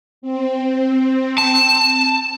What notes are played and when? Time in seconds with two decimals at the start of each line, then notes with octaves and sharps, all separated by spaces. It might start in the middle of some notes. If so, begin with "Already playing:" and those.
0.22 C4
1.38 A5